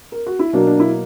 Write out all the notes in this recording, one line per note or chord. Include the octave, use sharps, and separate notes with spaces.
A#4
F#4
E4
B2 F#3 A#3 D4
D4
E4